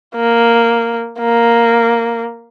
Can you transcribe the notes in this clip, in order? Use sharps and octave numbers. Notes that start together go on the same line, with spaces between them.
A#3
A#3